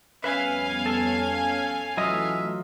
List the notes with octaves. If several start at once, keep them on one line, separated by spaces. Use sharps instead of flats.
F2 G3 B3 C#4 B4 E5 F5 G#5
A4
E3 F#3 A3 F4 D#5 E5